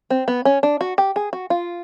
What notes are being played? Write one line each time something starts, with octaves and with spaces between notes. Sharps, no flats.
C4
B3
C#4
D4
F#4
G4
G#4
F#4
F4